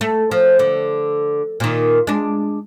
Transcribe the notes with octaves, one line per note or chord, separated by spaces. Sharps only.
A3
F3
D3
A#2 D#3
G#3 D4